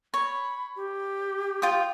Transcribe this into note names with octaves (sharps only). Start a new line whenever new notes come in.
C#5 B5
G4
F4 G5 D#6